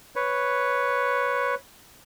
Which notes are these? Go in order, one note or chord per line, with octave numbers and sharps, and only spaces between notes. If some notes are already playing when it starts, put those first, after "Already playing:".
B4 C#5